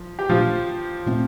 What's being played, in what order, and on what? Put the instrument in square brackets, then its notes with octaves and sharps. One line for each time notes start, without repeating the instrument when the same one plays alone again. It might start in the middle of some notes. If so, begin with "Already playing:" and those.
Already playing: [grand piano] F3
G4
[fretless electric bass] A#2 A3 D4 [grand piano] F3 F4
[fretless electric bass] A#2 A3 C4